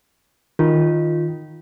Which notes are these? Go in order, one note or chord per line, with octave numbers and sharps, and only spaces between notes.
D#3 F4